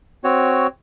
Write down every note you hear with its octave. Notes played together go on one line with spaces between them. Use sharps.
C4 F#4 C#5